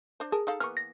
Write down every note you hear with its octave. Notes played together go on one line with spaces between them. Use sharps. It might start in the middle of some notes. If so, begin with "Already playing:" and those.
D4 C5
G#4 A#4 G#5 A5
D#4 A4 F5
E3 A#3 B3 C#6 F6
A#6